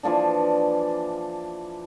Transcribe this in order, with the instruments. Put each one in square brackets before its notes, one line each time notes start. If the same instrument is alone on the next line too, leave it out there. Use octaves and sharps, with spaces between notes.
[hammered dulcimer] E3 F3 A#3 D4